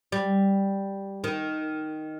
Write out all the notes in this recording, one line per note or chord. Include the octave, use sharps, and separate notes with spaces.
G3
D#3